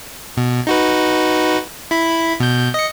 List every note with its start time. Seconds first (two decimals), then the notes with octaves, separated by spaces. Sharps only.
0.37 B2
0.67 D#4 F#4 B4
1.91 E4 B5
2.40 B2 G6
2.74 D#5 C#7